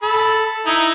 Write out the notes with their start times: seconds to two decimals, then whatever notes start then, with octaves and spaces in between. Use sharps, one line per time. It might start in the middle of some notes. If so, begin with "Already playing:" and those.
0.02 A4 B5
0.66 D#4 E4